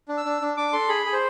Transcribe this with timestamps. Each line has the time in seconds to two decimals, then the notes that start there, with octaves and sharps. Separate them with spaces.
0.09 D4
0.17 E6
0.25 D4
0.42 D4
0.57 D4 D6
0.73 A4 C6
0.89 G#4 B5
1.06 G#4
1.13 C5